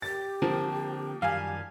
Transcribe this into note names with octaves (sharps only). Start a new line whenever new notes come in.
G4 A6
D3 F3 A#3 C4
F#2 D#3 G3 F5 G#5